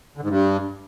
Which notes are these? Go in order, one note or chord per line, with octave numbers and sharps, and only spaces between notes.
D3
G#2
G2